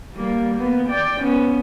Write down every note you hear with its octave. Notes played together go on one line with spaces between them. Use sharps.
G3 A#3
A#3 B3
D5 G5
B3 C#4